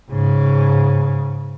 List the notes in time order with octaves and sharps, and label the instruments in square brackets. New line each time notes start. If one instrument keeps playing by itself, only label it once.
[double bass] G#2 C#3